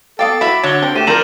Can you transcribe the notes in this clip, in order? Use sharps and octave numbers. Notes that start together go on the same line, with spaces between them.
B3 A4 F5 G5 D6 A6 D7
F#3 E4 E5 B5
D3 F#3 C#5 A6 G7
C4 A#4
A3 G4 D#7 E7
F3 C4 D4 A#4 B4 A#5 F#7